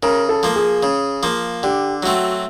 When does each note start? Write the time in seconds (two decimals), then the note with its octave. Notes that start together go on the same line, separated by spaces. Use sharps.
0.03 C#3 A#4
0.29 A4
0.43 F3 A#3
0.56 G#4
0.83 C#3
1.23 F3 A#3
1.63 D3 G4
2.03 F#3 A3 C4 F#4